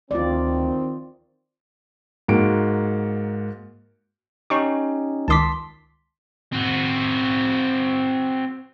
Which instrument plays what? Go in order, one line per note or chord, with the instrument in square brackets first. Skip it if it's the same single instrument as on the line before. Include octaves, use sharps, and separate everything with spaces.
[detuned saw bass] D2 [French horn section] D#3 C4 [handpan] F4 D5
[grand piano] G#2 A#3 F#4 D7
[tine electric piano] C#4 D#4 G4 [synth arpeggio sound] C#6
[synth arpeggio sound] C#2 D#3 D6 [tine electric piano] A5 C6 B6
[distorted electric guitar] C4 F#4